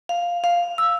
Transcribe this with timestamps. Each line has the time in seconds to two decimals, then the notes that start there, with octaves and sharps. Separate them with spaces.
0.09 F5
0.44 F5
0.78 E6